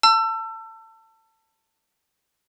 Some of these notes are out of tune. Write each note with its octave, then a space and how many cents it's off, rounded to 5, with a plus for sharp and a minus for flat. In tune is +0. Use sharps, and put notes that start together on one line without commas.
A5 +25 E6 +30